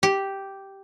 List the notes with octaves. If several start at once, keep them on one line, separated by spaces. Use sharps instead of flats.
G4